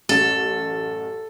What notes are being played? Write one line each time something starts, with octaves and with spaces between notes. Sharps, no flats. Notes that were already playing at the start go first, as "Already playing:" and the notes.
A1 F#2 A4